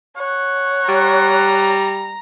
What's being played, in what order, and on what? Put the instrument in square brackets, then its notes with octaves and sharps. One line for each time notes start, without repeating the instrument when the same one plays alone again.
[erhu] C#5 [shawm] F#5
[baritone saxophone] G3 [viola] A#5